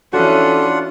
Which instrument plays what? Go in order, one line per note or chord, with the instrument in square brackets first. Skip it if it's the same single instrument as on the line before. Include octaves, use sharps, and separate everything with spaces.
[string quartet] E3 C#4 [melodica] D4 F4 F#5 [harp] F#4 [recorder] A4